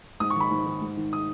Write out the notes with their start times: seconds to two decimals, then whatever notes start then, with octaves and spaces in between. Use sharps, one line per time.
0.20 G#2 D#6
0.30 C#6
0.36 D#3 B5
0.51 G#2
0.66 D#3
0.82 G#2
0.97 D#3
1.13 D#6